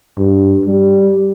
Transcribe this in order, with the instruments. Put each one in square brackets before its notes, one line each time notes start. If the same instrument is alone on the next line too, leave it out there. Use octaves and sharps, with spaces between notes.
[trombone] G2
G3